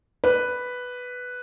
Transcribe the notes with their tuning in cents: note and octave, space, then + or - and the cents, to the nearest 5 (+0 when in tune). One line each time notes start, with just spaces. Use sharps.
B4 +0 D5 +0